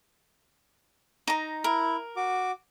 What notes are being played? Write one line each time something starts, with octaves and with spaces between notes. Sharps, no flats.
D#4 A#5
E4 A#4
F#4 D6